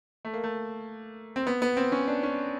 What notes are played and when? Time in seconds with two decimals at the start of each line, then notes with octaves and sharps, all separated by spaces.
0.25 A3
0.33 A#3
0.44 A3
1.36 C4
1.47 B3
1.62 B3
1.77 C4
1.92 C#4
2.08 D4
2.23 C#4